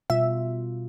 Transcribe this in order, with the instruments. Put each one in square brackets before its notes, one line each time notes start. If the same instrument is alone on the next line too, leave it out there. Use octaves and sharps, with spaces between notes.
[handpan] B2 G3 F4 [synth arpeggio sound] E5